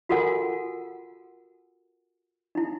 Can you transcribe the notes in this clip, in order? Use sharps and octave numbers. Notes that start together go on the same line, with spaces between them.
F4 F#4 A4 A#4 F#5 G#5
D#4 E4